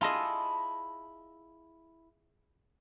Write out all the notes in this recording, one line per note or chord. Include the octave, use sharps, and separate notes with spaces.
E4 F4 G#4 D#5 A5